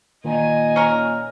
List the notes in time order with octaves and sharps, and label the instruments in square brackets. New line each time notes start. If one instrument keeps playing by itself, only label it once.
[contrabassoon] A#2 [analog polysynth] D#3 [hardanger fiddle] D#5 G#5
[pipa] C#4 A#4